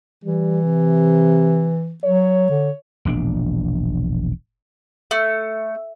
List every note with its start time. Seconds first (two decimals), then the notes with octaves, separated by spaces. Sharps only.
0.24 E3 G3
0.65 C3
2.04 F#3 C#5
2.49 D3
3.05 E1 A#1 D4
5.11 A3